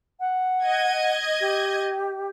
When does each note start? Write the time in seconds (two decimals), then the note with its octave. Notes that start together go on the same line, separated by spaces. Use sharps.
0.20 F#5
0.65 D#5 G#6
1.41 G4